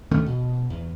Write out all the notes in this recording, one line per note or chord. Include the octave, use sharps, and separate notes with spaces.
D2 D#3 A3 C#4
B2
E2